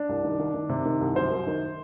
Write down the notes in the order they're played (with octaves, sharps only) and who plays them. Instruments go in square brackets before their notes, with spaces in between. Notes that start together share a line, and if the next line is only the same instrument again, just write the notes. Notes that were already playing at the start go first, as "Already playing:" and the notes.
Already playing: [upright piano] D4
C2
D#3
D#3
D#3
C3
D#3
C2
F#2 C5
F#2
D#3